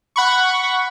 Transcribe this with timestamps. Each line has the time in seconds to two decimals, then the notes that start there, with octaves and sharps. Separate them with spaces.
0.16 F#5 B5 C#6